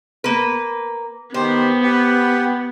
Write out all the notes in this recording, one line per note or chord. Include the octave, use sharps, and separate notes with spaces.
A#3 B4
D#3 B3 G4 C5
G4 B4 F#5